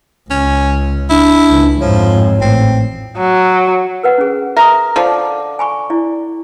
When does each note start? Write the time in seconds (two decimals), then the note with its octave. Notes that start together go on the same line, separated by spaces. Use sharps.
0.30 C#2 C#4
1.10 D4 E4
1.49 C#2
1.80 F2 G#2 F3 C#5
2.41 A1 C4
3.17 F#3
4.03 A#4 B4 F#5
4.18 C#4 G#4
4.57 A#4 E5 A#5 D#6
4.96 D3 F3
5.59 G#5 B5 C#6
5.90 E4 D5